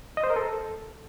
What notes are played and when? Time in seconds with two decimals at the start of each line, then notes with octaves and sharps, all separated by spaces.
0.17 D#5
0.24 C5
0.30 A#4
0.36 A4